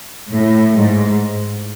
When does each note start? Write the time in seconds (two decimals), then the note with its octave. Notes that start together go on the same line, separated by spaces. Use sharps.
0.31 A2
0.75 G#2